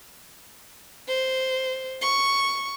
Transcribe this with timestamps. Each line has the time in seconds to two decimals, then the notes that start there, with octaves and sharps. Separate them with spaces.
1.08 C5
2.01 C#6